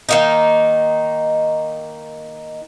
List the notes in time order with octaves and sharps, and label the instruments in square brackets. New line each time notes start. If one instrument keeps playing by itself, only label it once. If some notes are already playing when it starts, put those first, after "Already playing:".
[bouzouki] D#3 A#3 D#4